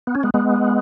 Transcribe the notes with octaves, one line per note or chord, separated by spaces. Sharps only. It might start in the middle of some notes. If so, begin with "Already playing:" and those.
B3
C#4
G#3 B3
G#3 B3